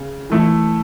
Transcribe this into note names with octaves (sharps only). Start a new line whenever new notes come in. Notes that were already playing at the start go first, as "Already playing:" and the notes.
Already playing: C#3
E3 A3 E4 A4